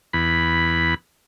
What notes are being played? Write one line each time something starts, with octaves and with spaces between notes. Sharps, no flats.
E2 B5